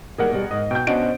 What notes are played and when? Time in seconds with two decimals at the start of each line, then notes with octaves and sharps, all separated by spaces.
0.18 D#3 G3 A#3 G#4 A#4 F#5
0.32 B2 G3
0.51 G#2 D#5
0.71 B2 G5 G6
0.87 B2 C#4 D4 F#4 C5 D#5 F#5 D7